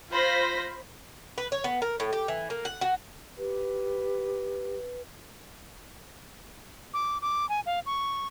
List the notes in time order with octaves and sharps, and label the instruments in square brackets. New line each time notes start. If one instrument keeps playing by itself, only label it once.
[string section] F4 C5 B5 A#6
[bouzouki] B4
C#5
B3
A#4
A2
G4
E3
A#3
F#5
F#4
[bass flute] G4 [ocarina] B4
[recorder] D6
D6
G#5
F5
C#6